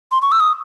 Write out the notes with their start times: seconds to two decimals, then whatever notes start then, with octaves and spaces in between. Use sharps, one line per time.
0.12 C6
0.22 C#6
0.32 E6
0.40 D#6